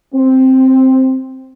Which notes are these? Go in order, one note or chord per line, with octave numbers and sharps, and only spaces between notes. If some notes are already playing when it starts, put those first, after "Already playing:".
C4